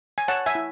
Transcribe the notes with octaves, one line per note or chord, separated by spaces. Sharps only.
G#5
C#5 F#5 A5
E5 G#5
E4